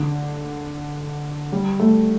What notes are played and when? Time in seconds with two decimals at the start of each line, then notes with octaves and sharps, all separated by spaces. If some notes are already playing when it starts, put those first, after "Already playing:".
Already playing: D3
1.52 G3
1.80 A3